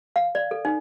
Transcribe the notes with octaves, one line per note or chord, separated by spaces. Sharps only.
F5
D5
A4
D#4